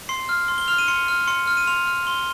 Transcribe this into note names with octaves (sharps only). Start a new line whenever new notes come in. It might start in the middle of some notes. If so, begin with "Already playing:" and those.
C6 C7
F6
C6
G7
F6 F7
D#7
C6 C#7
F6
C6 C#7
F6
D#7
C6 F7
F6
C6 G7